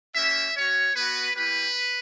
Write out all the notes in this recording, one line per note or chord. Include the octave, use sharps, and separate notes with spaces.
A#3 C#4 G4 E5
C#4 F#4 C#5
B3 F#4 B4
A#3 E4 G4 B4